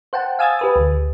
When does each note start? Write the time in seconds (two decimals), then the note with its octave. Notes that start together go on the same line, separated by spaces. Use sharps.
0.13 C5 F#5 G5 A5
0.39 F5 G#5 D#6 E6 G#6 A6
0.59 G4 B4 D#6
0.76 D2